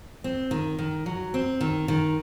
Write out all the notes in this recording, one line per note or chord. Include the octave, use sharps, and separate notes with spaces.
C4
D#3
D#3
F#3
C4
D#3
D#3